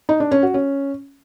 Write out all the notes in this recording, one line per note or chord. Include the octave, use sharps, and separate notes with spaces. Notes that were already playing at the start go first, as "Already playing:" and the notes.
D#4
D4
C#4
F#4
C#4